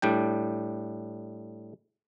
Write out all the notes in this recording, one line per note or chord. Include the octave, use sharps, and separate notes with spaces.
A2 G3 D4 G5